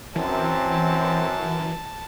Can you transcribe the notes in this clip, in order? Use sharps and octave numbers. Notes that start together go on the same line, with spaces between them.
F#2 E3 C4 A5